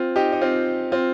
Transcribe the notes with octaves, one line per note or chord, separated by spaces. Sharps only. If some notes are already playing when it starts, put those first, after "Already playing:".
Already playing: C4 F4
D#4 G4
D#4
C4 F4
C4 F4